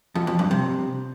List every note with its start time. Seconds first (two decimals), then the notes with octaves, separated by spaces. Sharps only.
0.15 F2
0.27 F2
0.39 G2
0.51 C3